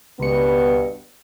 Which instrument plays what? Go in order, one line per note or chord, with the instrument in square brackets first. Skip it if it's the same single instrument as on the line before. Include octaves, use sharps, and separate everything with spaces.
[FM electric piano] C#2 C#7 [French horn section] G2 B2 B3